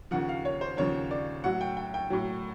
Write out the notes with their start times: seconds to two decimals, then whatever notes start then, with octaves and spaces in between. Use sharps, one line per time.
0.11 D#2 C#3 F3 F#5
0.29 F5
0.45 C#5
0.61 C5
0.77 D#2 C#3 F3 C#5
1.11 D5
1.44 A2 F#3 F#5
1.61 G5
1.77 G5
1.94 G5
2.10 A2 F#3